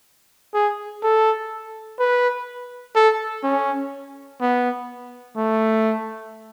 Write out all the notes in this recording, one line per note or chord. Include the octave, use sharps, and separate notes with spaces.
G#4
A4
B4
A4
C#4
B3
A3